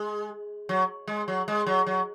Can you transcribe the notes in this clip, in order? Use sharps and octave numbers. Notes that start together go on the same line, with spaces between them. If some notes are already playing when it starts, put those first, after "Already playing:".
Already playing: G#3
F#3
G#3
F#3
G#3
F#3
F#3